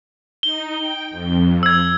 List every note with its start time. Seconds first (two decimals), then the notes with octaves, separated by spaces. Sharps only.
0.43 D#4 G7
0.79 G5
1.10 F2
1.63 E6 G#6